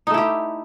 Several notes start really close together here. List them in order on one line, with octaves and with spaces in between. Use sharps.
D#4 A3 E4 G4